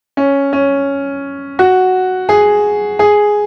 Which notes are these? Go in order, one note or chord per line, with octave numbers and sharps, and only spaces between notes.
C#4
C#4
F#4
G#4
G#4